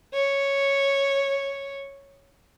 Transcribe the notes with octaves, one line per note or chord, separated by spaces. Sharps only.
C#5